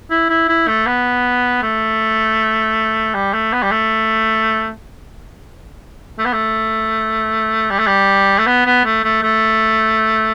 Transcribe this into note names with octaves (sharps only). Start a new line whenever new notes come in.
E4
E4
E4
A3
B3
A3
G3
A3
B3
G3
A3
A3
B3
A3
G3
A3
G3
A3
B3
B3
A3
A3
A3